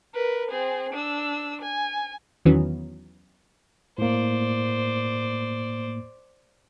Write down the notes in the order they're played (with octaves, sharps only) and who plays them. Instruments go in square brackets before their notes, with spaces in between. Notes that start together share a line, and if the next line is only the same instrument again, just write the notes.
[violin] A#4 B4
C4 G#4
D4 E6
G#5
[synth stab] E2 D#3 E3 F#3 B3 C#4
[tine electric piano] A2 A#3 [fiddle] C5 D5